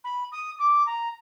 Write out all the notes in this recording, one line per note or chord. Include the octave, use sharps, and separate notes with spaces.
B5
D#6
D6
A#5